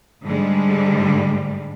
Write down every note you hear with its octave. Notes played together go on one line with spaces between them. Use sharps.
G#2 D3 G3 G#3